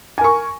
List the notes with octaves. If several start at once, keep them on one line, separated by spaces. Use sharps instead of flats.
A#4 G#5 C#6